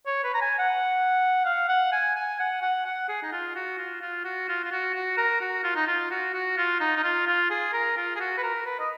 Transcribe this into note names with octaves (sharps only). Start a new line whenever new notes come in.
C#5
B4
A#5
G#5
F#5
F5
F#5
G#5
G#5
F#5
F#5
F#5
G#4
D#4
F4
F#4
F4
F4
F#4
F4
F4
F#4
F#4
A#4
F#4
F4
D#4
F4
F#4
F#4
F4
D#4
D#4
F4
F4
G#4
A#4
F4
G#4
F#4
B4
A#4
B4
D#5